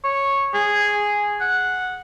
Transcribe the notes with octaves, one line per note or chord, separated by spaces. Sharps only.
C#5
G#4
F#5